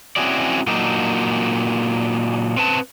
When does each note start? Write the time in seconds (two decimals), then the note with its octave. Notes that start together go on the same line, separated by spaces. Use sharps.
0.16 C4 C#4 E4 F#4 G#4 D5
0.67 A#2 F#3 A#3 D4 D#4
2.57 C4 B4 A5